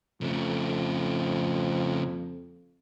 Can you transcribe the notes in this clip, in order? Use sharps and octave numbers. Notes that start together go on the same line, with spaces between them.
F2 C#3 A3